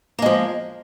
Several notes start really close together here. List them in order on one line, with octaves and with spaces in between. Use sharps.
A#3 G#3 F3